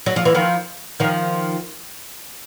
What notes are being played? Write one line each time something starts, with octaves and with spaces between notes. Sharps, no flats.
F#3
F3
E3
D#3 F3
D#3 F3